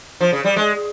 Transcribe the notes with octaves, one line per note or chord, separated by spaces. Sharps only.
F3
C#3
G3
G#3